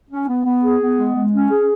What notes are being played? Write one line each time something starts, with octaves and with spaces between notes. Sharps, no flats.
C#4
B3
B3
G#4
B3
G#3
G#3
C#4
G#4